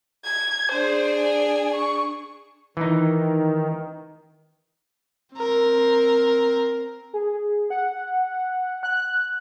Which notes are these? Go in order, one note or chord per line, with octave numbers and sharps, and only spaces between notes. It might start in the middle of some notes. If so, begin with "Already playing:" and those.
G#6
D4 G#4 C5
G#5
C#6
D#3 E3 D#4
C4 A#4
G#4
F#5
F#6